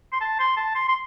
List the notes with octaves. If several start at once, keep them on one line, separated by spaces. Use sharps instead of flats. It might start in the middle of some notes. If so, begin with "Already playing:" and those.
C6
A5
C6
A5
C6
C6